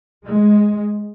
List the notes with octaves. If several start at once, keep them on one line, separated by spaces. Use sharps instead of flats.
G#3